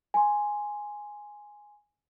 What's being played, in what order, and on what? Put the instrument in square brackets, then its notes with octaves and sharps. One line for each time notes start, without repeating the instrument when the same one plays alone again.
[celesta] G#5 C6